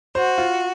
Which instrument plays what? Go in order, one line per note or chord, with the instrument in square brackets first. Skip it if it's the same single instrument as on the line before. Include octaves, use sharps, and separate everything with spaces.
[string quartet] F#4 [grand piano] C5
[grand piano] F4